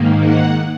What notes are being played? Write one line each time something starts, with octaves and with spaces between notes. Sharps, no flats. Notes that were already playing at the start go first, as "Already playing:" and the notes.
Already playing: G#2 D#3 A#3
F#5